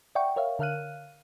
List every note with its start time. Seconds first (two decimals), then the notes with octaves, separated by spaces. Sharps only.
0.15 D5 E5 F#5 G5 C#6
0.36 A#4 C#5 E5 F5
0.59 D3 A#4 F5 F6 F#6 D#7